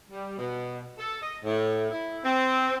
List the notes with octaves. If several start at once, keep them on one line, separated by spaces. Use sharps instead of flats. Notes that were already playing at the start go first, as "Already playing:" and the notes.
G3
B2
A4
D#5
A2
E4
C4